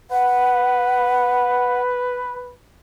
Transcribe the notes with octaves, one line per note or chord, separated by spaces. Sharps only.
B4 F#5